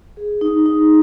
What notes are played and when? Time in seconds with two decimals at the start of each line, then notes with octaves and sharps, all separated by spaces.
0.17 G#4
0.41 D#4
0.66 D#4